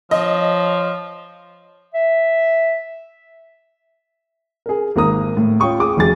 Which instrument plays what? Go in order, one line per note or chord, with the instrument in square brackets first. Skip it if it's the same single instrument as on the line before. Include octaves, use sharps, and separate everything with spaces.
[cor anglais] F3 [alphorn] C#5 [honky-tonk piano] D#5
[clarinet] E5
[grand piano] G#4 A#4
G#1 A#3 A#5 D#6
A2
F4 C#5 G5 C#6 D#6
G#4 D6 D#6
F1 F#2 G#4 A6